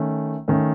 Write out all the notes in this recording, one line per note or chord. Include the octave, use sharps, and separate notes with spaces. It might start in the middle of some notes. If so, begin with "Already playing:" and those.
Already playing: D#3 A3 C#4
D#3 A3 C#4